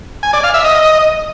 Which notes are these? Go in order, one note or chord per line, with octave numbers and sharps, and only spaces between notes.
G#5
D5
F5
E5
D#5